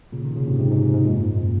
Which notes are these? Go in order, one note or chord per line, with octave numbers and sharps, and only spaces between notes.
A#2 C#3
C3 D#3
A#2 C#3
G#2 C3
G#2 C3
G#2
G#2
G#2
F#2 A#2
G#2
F#2
A#2